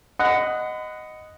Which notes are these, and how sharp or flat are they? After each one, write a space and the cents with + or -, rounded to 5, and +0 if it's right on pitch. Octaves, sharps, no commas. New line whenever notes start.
D#5 +0 F#5 +0 B5 +40